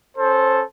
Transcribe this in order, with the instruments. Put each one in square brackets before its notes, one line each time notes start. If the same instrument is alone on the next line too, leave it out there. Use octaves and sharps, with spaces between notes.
[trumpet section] C#4 A4 C5